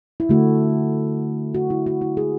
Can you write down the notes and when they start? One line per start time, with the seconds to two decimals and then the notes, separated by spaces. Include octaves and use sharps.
0.20 E4
0.29 D3 A3 F#4
1.55 F#4
1.70 E4
1.86 F#4
2.01 E4
2.17 G#4